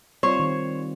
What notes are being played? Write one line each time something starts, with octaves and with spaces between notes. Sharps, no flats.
G3 C4 F4 C5 C#5
D#3 C4